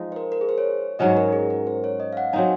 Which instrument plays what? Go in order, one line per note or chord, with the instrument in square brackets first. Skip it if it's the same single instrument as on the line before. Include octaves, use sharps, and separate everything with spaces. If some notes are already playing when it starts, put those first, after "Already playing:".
Already playing: [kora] F3 G#3 D#4
[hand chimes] C5
A#4
A#4
G#4
C5
C#5
[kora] G#2 F#3 C#4 F#4 [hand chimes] D#5
[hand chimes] A#4
G#4
A#4
C5
C#5
D#5
F5
F#5
[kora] F#3 C4 D#4 [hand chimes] G#5